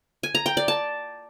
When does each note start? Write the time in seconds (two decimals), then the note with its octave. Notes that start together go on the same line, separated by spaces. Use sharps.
0.23 G#5
0.35 A#5
0.46 G5
0.57 D5
0.68 A5